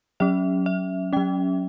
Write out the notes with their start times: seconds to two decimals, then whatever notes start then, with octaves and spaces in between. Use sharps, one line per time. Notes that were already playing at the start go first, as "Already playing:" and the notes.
0.20 F#3 C#4 E5
0.66 E5
1.13 F#3 C#4 G5